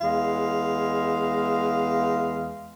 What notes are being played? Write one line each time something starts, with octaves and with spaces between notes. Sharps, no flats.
E2 G#3 F5